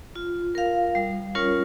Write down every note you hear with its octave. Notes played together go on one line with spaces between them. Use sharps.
F4
A#4 F5
G3
C#4 F4 A#4 C#5